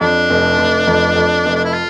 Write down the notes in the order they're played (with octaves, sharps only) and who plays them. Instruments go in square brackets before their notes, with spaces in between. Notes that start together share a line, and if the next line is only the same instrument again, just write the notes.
[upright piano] F2 [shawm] D4
[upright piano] F1
F1
F2
F2
F1
[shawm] D4
E4
F4